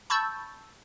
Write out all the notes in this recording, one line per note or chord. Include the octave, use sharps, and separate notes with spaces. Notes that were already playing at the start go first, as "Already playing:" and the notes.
A5 B5 C#6 E6 G6 A6